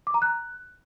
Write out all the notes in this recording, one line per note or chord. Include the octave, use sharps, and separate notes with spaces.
D6
A#5
F#6